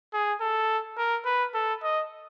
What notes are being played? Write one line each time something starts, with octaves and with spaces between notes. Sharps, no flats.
G#4
A4
A#4
B4
A4
D#5